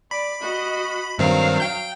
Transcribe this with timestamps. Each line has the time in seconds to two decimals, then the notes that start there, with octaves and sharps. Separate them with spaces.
0.11 D5 B5
0.41 F#4 D#5
1.19 G2 D#3 F#3 C4 F5
1.60 G5 G6